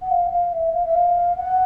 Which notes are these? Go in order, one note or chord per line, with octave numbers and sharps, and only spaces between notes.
F#5
F5
F5
E5
F5
E5
F5
F#5